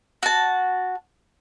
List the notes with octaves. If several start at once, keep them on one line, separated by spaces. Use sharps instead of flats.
F#4 A5